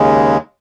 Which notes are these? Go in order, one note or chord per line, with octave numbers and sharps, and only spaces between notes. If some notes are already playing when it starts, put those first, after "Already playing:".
Already playing: D#2 C#3 G#3